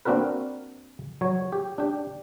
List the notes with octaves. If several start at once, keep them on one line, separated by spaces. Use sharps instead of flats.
A#3 C4 D4 F#4 A#4 B4
F#3 C#5
G4
D4 G4